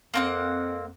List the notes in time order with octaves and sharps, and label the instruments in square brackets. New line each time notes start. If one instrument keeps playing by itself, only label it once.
[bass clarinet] F2 [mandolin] A#3 C4 F#5